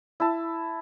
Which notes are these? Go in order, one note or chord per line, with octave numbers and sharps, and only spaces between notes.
E4 A5